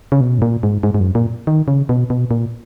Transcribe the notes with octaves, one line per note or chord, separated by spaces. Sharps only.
C#3
B2
G#2
A#2
G#2
G#2
G#2
F#2
A#2
D#3
C#3
B2
B2
A#2